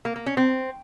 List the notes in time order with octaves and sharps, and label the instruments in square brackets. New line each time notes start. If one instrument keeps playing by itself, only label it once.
[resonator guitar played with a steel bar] A#3
A#3
C#4
C4